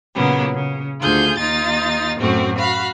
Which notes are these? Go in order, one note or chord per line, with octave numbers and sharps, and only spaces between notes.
A#2 C#3 F#3 A#3 B3
C#3
D2 F4 G#4 G6
D#2 D#4 F4 A6
F#2 A2 A3 C4 F#4
F#4 F5 B5